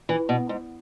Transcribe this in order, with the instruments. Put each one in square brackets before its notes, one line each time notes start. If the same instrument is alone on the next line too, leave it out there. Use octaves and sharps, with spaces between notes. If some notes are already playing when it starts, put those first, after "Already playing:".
[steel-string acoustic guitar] E3
B2
G#2